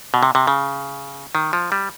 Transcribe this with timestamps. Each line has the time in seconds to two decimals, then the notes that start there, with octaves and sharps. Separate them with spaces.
0.14 B2
0.23 C3
0.35 C3
0.47 C#3
1.35 D#3
1.53 F3
1.72 G3